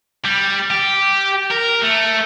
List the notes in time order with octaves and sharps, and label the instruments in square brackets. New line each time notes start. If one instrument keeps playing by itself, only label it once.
[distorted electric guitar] G3
G4
A#4
A3